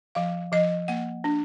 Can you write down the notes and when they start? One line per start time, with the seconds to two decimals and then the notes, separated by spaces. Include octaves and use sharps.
0.15 F3 F5
0.52 F3 D#5
0.88 A#3 F#5
1.24 D4